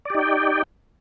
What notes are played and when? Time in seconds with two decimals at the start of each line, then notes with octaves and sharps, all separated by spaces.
0.05 D5
0.10 G4
0.15 D#4
0.19 G5